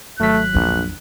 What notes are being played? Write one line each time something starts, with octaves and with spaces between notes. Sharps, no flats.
G#1 F#3 A3 F#6 B6
A#1 E2 D3